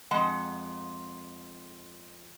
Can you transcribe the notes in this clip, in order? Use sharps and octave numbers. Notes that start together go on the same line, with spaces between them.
F2 G#3 F#5